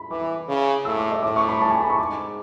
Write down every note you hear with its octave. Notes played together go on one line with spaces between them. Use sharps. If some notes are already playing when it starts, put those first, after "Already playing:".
Already playing: B5
E3 D6
C#3
A2 E6
D6
E5
A2 D6
C#6
B5
A5
G#5
B5
C#6
G#2 D6